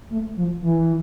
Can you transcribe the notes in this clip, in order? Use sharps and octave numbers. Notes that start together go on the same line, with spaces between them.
A3
F3
E3